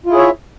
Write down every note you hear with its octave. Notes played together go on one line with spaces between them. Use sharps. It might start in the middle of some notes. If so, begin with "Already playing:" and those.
E4 F4 G#4 C#5 E5